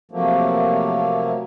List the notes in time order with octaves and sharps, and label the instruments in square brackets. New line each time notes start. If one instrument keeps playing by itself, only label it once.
[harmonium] C3 F3 F#3 A3 A#3